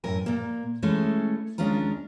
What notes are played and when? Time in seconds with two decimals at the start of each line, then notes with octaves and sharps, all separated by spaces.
0.04 F#2 A2 A#4 G#5
0.26 A#2 A#3
0.82 E3 G#3 A3 C#4 A4
1.58 D#2 G#3 C#4 D4 F4 A#5